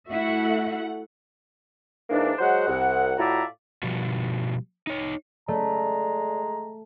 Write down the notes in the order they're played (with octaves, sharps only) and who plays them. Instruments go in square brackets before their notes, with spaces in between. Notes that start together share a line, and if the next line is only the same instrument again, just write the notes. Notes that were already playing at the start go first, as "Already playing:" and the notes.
[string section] A3 F#5 [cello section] E4 F#4 E5
[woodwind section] G#2 E3 A#3 D4
F#3 G#3 C5 F#5
C2 F#5
A2 F4 F#4 D5 E5 A#5
[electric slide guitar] B2 F3 G3 F#4
D#4 C#5
[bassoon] G#3 [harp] A3 [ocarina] D5 [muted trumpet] A#5